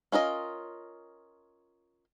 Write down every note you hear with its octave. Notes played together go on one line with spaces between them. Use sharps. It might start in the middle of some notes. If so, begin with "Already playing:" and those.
C#4 F4 A#4 D#5